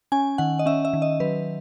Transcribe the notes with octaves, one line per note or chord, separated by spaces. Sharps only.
C#4 G#5
D#3 F#5
D#5
C#4 E5
E5
D#3
D#5
F#3 B4